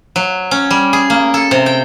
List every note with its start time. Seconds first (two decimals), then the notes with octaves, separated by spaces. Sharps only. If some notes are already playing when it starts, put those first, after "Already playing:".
0.16 F#3
0.51 C#4
0.71 G3
0.93 G#4
1.10 A#3
1.34 A4
1.51 C3
1.66 G5